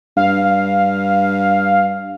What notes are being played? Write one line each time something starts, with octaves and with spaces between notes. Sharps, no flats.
G2 F5